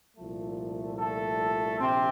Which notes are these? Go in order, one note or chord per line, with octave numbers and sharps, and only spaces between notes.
C2 A#2 F3 A3
A3 A4
A#1 C3 C4